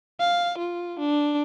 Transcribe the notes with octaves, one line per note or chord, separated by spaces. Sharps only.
F5
F4
D4